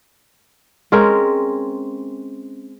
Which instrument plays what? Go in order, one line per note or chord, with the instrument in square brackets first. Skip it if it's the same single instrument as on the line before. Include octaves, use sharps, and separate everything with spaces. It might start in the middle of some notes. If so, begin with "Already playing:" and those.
[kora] G#3 C4 C#4 A#4